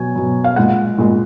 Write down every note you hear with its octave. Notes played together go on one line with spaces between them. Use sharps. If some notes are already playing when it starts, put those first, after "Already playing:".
Already playing: B2 F#3 G#5
B2 F#3
F5
A#2 G#3 F#5
A#2 G#3